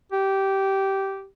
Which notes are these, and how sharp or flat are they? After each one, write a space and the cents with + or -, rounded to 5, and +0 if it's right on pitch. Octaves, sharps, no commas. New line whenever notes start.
G4 -15